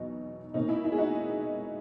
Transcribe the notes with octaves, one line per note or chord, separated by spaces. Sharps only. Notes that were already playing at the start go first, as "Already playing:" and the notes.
Already playing: E2 B2 F#3 D#4
B2 A#3 C#4 D#4
E4
E4
G#4
D#4 F#4